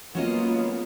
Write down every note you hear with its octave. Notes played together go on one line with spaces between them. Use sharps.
F#3 G#3 A#3 B3 C#4 F4 D#5